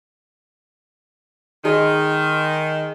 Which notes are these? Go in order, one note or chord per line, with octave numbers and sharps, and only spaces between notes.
D#3 G#3